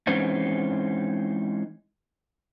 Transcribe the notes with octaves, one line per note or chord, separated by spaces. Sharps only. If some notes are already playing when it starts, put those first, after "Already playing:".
E3 G#3 C4 C#4 D#4